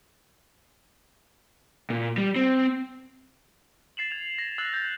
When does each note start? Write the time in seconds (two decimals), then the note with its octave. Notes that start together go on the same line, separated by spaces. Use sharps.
1.90 A#2
2.18 G3
2.36 C4
3.97 A6 C7 E7 F#7
4.11 G#6 F7
4.38 A#6
4.58 E6 F#6 A6 C7 F#7
4.73 G6 A6